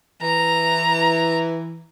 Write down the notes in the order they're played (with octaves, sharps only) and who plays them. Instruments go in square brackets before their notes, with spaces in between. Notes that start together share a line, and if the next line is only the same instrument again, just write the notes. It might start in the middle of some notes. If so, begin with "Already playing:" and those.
[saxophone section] E3 [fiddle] A#5